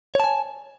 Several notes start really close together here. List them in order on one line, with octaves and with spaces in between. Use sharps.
C#5 A5 G#5